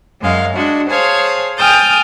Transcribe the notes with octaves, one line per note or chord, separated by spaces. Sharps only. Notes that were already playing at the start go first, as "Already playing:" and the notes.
F#2 G#3 F5
G#3 D4 F#4
G#4 C5 C#5 F5 G#5 A5
G5 G#5 D#6 F6 G6 A6